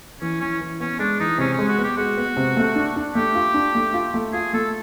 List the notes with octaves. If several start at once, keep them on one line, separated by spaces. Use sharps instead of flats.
E3 C#4
E3 C#4
E3
B3 C#4
G#3 D4
E3 D#4
C3 C#4
C#4
G#3
F#4
B3 G4
G#3 F#4
B3
C3
A3
D4
D4
A3 G4
F4
D4
A3
F4
A3
F4 G#4
A3 A4